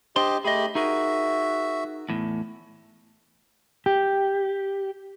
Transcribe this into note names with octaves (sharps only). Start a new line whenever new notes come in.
D4 G4 C5 D#5 C6
A3 G4 G#4 D#5 B5
D#4 F#4 G#4 A#4 E5
E2 A2
G4